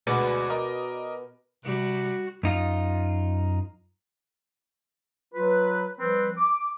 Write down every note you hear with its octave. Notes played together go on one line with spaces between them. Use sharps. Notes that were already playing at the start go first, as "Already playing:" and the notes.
D2 B2 G#3 F#4 B4 D5
A#4 D#5 D6
C3 G3 F#4
F#2 D#4 F4
F#3 F4 B4
F3 G3 C4 B4
D6